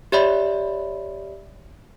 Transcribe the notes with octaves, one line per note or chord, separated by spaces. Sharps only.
G4 C#5 D5 E5 B5